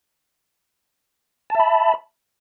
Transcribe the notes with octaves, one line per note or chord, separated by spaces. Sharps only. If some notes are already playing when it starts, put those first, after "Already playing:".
E5 A5 B5